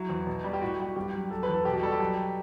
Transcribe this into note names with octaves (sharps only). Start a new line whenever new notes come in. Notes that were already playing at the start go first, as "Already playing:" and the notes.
Already playing: F#3 E4
E2
B2
G3
G4
A2 F#4
G3 F#4
G2 G4
F#3
F#3 A4
B4
E2
A4
B2 G4
F#4
G3 A4
G4
F#3